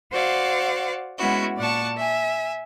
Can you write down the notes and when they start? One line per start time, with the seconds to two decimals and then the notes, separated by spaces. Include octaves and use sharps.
0.11 F#4 C5 D5 F5 F#5
1.17 G#3 B3 C#4 E4 F#4
1.58 A#2 D5 F#5 A5 C#6
1.96 E5 G#5